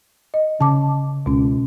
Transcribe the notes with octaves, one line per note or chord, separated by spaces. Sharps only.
D#5
C#3 A5 D6
C#2 B2 C#4